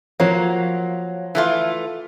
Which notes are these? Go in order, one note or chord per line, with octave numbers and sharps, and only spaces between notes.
F3 F#3 A#3 C#5
E3 A3 F4